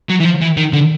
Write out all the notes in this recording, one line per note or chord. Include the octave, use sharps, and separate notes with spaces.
F#3
E3
F3
E3
D#3
D3